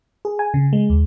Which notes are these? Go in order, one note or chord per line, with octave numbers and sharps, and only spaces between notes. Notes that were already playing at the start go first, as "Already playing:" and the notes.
G#4
G#5
C#3
G#3
D#2